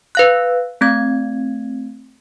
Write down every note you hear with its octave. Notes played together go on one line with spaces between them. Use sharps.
B4 F5 F#6
A3 C4 G#6